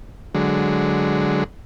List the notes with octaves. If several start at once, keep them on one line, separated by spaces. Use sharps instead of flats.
D3 F#3 G#3